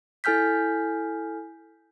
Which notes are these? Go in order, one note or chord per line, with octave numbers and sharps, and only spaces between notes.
E4 A4 G#5 F6 G6 B6